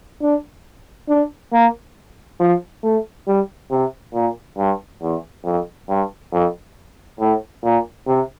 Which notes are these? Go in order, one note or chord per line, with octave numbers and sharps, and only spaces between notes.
D4
D4
A#3
F3
A3
G3
C3
A#2
G2
E2
F2
G2
F2
A2
A#2
C3